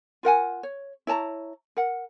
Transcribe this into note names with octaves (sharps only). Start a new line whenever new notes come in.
F4 A#4 F#5 G#5
C#5
E4 C#5 A5 A#5
A#4 F#5